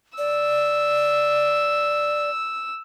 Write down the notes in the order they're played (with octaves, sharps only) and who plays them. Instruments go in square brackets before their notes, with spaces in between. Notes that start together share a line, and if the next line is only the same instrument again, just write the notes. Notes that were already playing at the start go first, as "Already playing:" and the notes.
[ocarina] D5 [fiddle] E6